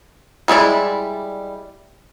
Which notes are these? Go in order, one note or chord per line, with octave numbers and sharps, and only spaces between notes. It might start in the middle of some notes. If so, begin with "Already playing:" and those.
G3 G#3 E4 D5